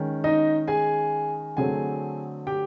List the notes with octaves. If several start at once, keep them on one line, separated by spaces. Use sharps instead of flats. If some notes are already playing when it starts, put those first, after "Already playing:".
Already playing: D#3 G#3 C#4
D#4 D#5
G#4 G#5
D3 F#3 A3 C4 G#4 G#5
G4 G5